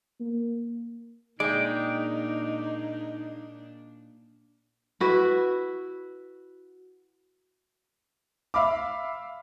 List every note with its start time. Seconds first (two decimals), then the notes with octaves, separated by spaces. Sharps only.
0.20 A#3
1.40 A#2 G#3 D4 D#4 D5 G5
5.00 E4 F#4 B4
8.54 E5 F5 B5 D6